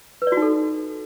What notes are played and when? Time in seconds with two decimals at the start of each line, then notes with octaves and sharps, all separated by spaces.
0.22 B4
0.27 D5
0.32 F#4
0.37 D#4
0.42 A4